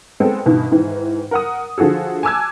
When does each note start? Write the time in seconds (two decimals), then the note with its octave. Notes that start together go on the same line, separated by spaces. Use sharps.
0.20 G#3 B3 C4 A4 G5
0.45 G2 B2 D#3 E3
0.71 G#2 D#3 E3
1.31 A#4 F#5 D#6
1.78 D3 F3 F#4 G#4 A4
2.23 G#5 A5 D6 E6 F#6 G#6